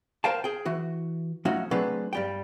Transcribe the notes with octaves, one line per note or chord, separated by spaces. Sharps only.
A#4 C5 F5 G5 A5
G#4 G5
E3 F#4
F3 A3 C#4 D#4 F#4
F#3 G#3 A3 C4 D4 B4
G2 G3 G5